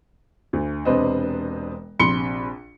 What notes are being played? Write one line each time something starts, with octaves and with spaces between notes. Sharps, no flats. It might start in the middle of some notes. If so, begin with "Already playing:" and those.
D2
E1 C3 D4 B4 C5 D#5
A#1 C3 B5 C6 C#7 G7